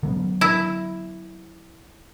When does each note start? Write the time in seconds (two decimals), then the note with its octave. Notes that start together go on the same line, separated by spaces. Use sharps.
0.03 D3 F#3 B3
0.41 E4